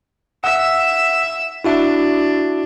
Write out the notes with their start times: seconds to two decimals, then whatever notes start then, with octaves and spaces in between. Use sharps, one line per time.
0.44 E5 F#5 E6
1.65 D4 E4 F#4 E5